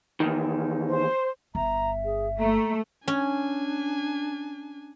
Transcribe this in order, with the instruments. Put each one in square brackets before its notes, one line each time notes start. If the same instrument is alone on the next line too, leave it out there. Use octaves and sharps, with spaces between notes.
[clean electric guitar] E2 D#3
[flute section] C5
[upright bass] G1 [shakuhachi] E5 [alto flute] A#5
[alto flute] G#4
[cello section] A3 [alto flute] A#5
[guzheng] C#4 [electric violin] D4 G#5